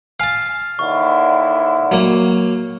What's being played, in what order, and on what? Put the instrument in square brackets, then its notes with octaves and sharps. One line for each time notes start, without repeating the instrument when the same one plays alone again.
[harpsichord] F5 A5 [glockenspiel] G#5 F6
[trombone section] D#2 D3 E4 [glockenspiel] C#6
[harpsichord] F#3 A#3